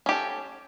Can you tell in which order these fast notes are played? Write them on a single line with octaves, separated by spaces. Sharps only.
C#4 G4 A4